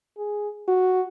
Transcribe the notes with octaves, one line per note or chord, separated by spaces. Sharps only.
G#4
F#4